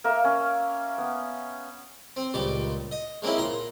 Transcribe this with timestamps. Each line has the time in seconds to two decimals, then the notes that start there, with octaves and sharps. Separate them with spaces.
0.04 A#3 A#4 E5
0.24 C#4
0.98 B3
2.17 C4
2.34 C#2 A#2 G3 D6
2.91 D#5
3.22 G#3 A#3 C4 C#4 E4
3.38 A#2 A#5 C6